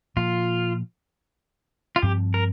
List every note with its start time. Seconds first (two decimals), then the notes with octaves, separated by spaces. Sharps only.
0.16 A#2 F3 A#3 F4
1.96 F4
2.02 G2 F3 C4 G4
2.34 A#4